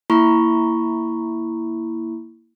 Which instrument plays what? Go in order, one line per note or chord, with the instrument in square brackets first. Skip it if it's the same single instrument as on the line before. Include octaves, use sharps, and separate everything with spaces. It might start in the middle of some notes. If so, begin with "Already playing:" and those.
[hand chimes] A#3 E4 A#5 B5 C#6